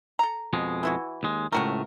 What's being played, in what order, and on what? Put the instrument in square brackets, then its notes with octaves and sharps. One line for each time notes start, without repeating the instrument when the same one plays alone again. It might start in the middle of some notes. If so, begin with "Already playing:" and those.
[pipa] A4 A#5
[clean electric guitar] F2 B2 G#3
[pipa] E3 E4 F#4
[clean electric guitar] D#2 G#3
[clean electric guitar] C#2 A2 A3 [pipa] C3 F#4 A#4